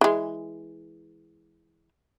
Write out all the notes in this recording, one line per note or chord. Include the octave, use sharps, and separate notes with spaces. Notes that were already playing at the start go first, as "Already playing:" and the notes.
E3 G#3